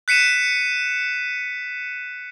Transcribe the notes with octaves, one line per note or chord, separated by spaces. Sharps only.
F#6 B6 C#7 D#7 E7